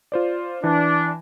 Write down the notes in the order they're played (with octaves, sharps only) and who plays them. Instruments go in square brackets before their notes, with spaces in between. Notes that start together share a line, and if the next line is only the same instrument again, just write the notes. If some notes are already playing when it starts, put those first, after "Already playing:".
[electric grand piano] F4 C5 D5
[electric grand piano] E3 [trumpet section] D4